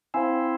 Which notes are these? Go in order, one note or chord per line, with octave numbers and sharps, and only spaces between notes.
C4 E4 C5 F5 G#5